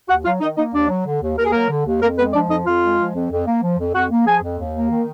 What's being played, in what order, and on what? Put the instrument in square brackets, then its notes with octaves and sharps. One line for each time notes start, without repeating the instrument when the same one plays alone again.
[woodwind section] D#2 F#4 F#5
F#3 F4 F5
D#3 D#4 D#5
A#3 D#4 D#5
D#2 D4 D5
F#3
D3
D#2
D#2 A#4
G#4
F#3 A#3 A#4
D3
D#2
F2 A#3 A#4
G#3 B3 B4
F3 D4 D5
F2 D#4 D#5
F2 F4 F5
G#3
F3
F2
F2
A#3
F3
F2
F2 F#4 F#5
A#3
F3 G#4 G#5
F2
D#2
A#3
D#3